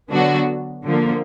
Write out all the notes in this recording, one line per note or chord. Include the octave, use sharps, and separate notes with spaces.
D3 F#3 B3 D4 F#4
D3 F3 A#3